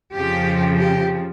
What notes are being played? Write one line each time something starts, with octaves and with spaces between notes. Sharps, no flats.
F2 C#3 F3 G4
G4